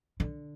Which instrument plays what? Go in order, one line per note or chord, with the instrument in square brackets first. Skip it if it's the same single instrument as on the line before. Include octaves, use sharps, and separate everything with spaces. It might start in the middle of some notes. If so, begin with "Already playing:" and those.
[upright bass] D3